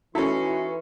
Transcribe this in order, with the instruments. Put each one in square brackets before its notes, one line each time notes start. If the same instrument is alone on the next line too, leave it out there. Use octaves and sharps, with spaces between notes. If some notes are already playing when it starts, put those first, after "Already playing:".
[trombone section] E3 [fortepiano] C#4 A4 [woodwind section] D#4 F#4 C6 [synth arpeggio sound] E4